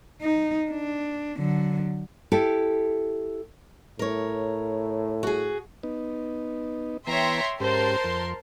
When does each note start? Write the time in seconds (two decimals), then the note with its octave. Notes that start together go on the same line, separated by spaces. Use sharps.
0.22 D#4
0.71 D4
1.38 D3 F#3
2.32 E4 G4 A4
3.99 A2 A#4 C#5
5.23 F#4 G#4
5.83 B3 D#4
7.07 E3 B3 C#5 E5 G5 A#5 C6
7.60 G#2 C#4 G4 A#4 C5 A5 C6
8.04 F2